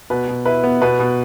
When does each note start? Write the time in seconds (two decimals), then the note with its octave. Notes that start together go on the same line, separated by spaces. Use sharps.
0.10 B2 B4
0.28 B2
0.45 E4 B4
0.64 B3
0.81 B2 B4
0.99 B2